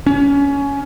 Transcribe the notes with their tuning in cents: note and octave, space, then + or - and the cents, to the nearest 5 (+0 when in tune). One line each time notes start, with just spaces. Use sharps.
C#4 +20